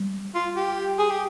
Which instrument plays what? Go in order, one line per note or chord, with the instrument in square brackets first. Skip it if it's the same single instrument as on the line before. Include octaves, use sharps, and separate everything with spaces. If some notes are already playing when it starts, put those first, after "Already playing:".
Already playing: [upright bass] G3
[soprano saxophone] F4
G4
G#4
G4